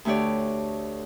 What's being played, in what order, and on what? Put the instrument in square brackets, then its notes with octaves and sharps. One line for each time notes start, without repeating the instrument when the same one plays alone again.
[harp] D2 A3 G4 C#5 D5